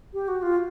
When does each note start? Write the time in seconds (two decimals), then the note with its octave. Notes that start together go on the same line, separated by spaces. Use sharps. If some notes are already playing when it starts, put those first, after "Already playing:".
0.14 G4
0.28 F#4
0.43 F4